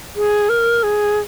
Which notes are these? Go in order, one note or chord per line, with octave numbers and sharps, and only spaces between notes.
G#4
A#4
G#4